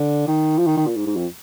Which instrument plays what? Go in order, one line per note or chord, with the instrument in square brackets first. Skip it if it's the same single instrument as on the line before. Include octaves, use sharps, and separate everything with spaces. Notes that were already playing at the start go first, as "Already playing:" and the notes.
Already playing: [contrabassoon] D3
D#3
F3
D#3
D#3
A#2
G#2
G#2
F2